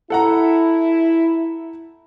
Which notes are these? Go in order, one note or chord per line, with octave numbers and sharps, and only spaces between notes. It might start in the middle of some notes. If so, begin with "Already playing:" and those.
E4 A4 F#5 A#5